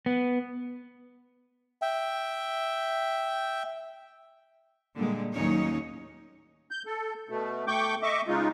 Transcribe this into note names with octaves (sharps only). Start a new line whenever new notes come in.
B3
E5 G5
A#2 D3 G3 G#3
D#2 A2 F#3 C#4 D#4 C#5
G6
A4
B2 A3
A3 G5 C#6 D6 G6
D#5 E5 C#6 D6
C#3 G#3 D#4 F4